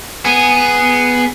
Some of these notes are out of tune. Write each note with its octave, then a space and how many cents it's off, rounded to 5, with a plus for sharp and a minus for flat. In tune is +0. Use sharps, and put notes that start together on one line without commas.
B3 +0 G#4 +0